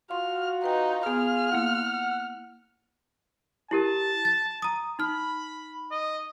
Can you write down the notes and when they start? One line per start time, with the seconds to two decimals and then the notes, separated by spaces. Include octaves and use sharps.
0.11 F4 F#4 C6 F6
0.64 D#4 B4 G5
1.06 B3 G#4 F5 F6
1.52 A#3 E4 F#5
3.71 E4 G4 A#4 A5
4.25 A6
4.62 A#5 D#6
4.99 D#4 B5 F6
5.91 D#5